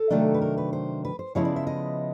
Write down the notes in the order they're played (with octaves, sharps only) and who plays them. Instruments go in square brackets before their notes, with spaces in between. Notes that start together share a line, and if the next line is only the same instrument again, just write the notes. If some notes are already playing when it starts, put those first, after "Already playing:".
Already playing: [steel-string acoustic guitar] A4
C3 D#3 F#3 A3 D4
B4
A#4
B4
C5
B4
C5
C#3 F3 G#3 B3 E4 C#5
D5
E5
D#5